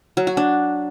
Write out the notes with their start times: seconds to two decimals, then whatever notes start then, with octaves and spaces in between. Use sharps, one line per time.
0.17 F#3
0.27 F#4
0.37 D4